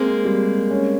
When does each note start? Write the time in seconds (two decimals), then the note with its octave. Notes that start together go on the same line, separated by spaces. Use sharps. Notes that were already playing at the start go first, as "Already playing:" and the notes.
Already playing: G#3 A#3 C4
0.25 G3
0.71 C#4